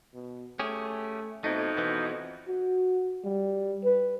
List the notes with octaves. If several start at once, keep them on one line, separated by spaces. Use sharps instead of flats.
B2
A3 C#4 G4 G#4
F2 B2 A3 D#4
B2 E3 B3
F#4
G3
B4